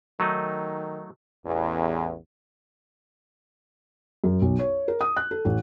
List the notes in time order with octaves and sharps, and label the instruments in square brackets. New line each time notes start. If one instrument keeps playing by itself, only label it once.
[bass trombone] D#3 [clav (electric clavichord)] F#3 A3 D#4
[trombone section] A1 E2
[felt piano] F#2
B1
C#5
A#4
D#6
F#6
A4
A1